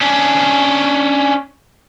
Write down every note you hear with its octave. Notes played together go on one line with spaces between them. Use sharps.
C#4 D4